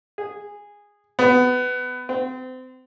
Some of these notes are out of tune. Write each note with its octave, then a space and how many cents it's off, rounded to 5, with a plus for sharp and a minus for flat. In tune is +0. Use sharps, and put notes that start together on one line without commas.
G#4 -15
B3 +20
C4 -30